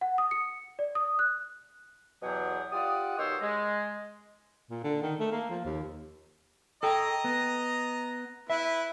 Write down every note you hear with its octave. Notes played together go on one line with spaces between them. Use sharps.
F#5
D#6
C#7
D5
D#6
F#6
E2 B2 F#3 G4 G#4 F#5
F4 G4 D5 F#5 D#6
B2 D#3 G4 C5 C#5 E6
G#3
A#2
D3
D#3
A3
A#3
F3
D#2
A4 D#5 G5 A#5
B3
E4 B4 E5